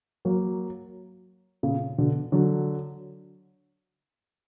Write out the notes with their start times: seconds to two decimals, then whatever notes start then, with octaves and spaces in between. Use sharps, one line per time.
0.25 F#3 A#3
1.63 A#2 C#3
1.98 B2 D3
2.32 D3 F#3